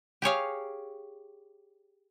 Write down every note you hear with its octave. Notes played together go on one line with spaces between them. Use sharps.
G4 G#4 C#5 F5